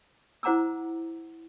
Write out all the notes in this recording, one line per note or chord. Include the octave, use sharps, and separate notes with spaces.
E4 C5 F#5 A#5 D6 E6